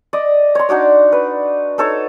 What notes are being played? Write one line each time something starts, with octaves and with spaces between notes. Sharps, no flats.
D5 D#5
C#5 C6
D4 D#4 F#4 D5
B4
D#4 A4 C#5